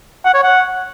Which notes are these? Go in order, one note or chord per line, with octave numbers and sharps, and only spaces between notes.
F#5
C#5
F#5